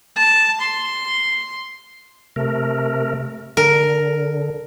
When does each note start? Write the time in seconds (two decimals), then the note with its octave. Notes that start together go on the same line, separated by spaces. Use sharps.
0.16 A5
0.61 C6
2.36 C3 A3 A#4
3.57 D3 A#4